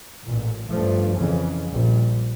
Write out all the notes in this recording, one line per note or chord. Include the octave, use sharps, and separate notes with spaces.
A1 A#2
G2 F3 A3
F2 C#3 E3
A#1 G3